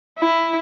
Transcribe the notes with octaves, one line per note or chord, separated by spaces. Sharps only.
E4